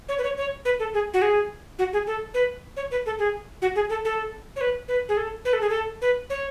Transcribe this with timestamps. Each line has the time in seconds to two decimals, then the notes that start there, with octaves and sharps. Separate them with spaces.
0.09 C#5
0.18 B4
0.24 C#5
0.37 C#5
0.65 B4
0.79 A4
0.94 G#4
1.14 F#4
1.22 G#4
1.79 F#4
1.93 G#4
2.07 A4
2.34 B4
2.77 C#5
2.91 B4
3.06 A4
3.19 G#4
3.62 F#4
3.76 G#4
3.90 A4
4.05 A4
4.56 C#5
4.61 B4
4.88 B4
5.09 G#4
5.17 A4
5.45 B4
5.53 A4
5.61 G#4
5.70 A4
6.02 B4
6.30 C#5